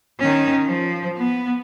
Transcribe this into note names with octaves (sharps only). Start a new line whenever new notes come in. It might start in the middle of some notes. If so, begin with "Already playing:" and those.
D#3 C#4
F3
B3